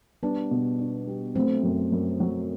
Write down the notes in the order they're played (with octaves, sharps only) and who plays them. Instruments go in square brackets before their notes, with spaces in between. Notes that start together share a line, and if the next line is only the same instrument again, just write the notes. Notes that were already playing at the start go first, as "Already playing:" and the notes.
[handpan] G3 B3 [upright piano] D4
[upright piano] B2
D4
G3
[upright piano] F#3 [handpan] A3 C4
[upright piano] F#2
F#2
F#3